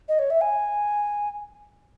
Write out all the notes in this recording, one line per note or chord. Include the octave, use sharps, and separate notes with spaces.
D#5
C#5
E5
G#5